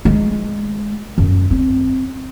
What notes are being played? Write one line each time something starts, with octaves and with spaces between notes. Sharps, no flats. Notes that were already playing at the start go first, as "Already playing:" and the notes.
G#3
F#2
C4